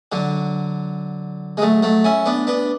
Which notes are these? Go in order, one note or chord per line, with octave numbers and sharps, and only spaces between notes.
D3 F#3
G#3
F#3 A3
F#3 A3
C#4 E4
B3 D4
B3 D4